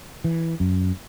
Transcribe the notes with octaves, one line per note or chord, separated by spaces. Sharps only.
E3
F#2